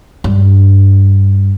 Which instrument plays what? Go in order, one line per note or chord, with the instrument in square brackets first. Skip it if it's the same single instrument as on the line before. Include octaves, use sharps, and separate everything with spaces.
[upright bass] G2